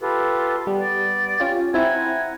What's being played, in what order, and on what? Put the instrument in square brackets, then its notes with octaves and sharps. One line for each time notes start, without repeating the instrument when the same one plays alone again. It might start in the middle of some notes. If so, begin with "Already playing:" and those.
[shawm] F4 [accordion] G4 A4 B4
[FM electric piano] G3 [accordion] B3
[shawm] D5
[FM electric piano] C#4 F4 G4
[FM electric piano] C4 E4 [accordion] F#5 A#5 [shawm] G#5